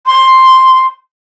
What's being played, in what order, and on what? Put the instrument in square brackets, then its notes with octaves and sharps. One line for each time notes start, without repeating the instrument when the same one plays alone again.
[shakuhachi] C6